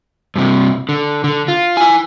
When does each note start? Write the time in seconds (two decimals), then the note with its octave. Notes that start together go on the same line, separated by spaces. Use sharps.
0.36 G2 C3
0.89 D3
1.24 D3
1.48 F4
1.77 E4 G#5